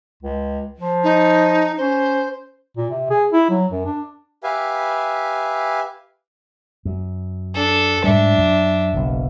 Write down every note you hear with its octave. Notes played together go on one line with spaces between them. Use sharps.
C#2
F3
D#4
C#4 C5
A#2
C3
G#4
E4
F#3
F#2
D4
G4 B4 E5 F5 G#5
F#2
D4 A4
G#2 G3 D4 E5
F#2 F#3
F#1 B1